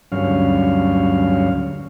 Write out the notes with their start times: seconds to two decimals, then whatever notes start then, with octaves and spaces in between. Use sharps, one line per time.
0.12 D2 G2 F#3 C#4 F5